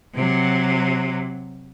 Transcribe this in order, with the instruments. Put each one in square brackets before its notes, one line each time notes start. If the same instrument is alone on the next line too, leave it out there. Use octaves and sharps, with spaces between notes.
[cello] C3 F#3